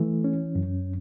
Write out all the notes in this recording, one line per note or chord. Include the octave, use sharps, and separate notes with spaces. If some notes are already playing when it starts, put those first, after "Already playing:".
Already playing: E3 A3
C#4
F#2